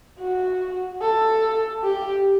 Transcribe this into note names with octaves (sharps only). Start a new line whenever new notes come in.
F#4
A4
G4